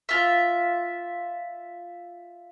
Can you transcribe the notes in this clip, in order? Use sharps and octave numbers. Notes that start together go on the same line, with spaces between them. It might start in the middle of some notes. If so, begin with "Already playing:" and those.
F4 E5